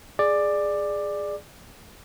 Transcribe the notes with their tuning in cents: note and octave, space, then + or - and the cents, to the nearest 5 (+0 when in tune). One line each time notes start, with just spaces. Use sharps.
G#4 +0 D5 +15